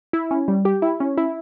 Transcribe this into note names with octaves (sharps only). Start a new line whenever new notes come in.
E4
C#4
G3
G4
E4
C#4
E4